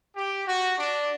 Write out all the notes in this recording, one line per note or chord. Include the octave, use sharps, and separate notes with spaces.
G4
F#4
D4